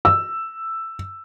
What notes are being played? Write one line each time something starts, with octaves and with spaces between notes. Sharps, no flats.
E6